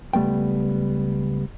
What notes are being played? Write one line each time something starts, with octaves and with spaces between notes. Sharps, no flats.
C#2 G3 A3 B3 G5